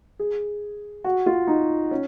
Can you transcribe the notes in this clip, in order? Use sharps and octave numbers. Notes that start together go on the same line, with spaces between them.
G#4
F#4
F4
D#4
C#4